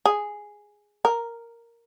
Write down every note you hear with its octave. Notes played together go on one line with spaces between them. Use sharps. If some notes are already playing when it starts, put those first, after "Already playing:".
G#4
A#4